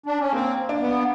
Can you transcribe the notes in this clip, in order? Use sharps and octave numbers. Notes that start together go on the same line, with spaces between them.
D4
C#4
A#3 C4
D4
B3